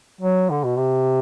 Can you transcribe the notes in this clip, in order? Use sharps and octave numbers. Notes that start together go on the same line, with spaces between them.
F#3
D3
B2
C3